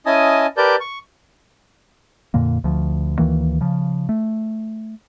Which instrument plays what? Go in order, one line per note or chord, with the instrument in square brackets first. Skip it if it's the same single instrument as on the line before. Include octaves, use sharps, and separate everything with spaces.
[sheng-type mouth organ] C#4 E4 D#5 G#5 A5 D#6
G4 A#4 B4 D5 A5 G6
C#6
[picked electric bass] F2 A#2 D3 A#3
D2 F3
D2 D#3 E3 A#3
C#3 F3
A3